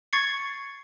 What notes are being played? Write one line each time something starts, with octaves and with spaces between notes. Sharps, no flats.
C#6 G#6 A6 C7 C#7